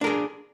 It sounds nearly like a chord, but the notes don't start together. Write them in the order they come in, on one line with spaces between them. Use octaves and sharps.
D4 A#4 G#4